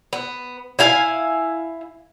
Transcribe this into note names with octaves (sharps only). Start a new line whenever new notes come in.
B3
E4 F5 G#5